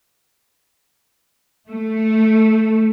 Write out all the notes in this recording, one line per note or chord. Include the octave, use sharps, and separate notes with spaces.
A3